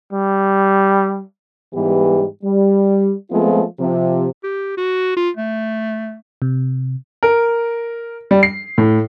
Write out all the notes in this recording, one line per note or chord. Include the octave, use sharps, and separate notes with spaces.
G3
G#2 E3 G3 B3 G4
G3
F3 G#3 A3 B3 C4 F4
C3 F3
G4
F#4
F4
A3
C3
A#4
G3
C7
A2